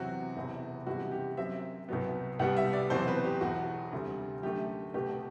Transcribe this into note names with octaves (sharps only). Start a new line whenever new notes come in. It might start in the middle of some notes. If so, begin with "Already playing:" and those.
Already playing: E2 C3 F#3 C4 F#4
E1 E2 C3
F#1 E2 C3 G3 F#4
G4
F#2 F#3 C4 E5
C2 B2 F#3 B3
C2 B2 G3 B3 F#5
E5
D5
E2 B2 F#3 C4 C5
B4
G4
E1 E2 B2 F#4
D2 C3 G3
F#2 D3 A3 G4
C2 B2 A3 G4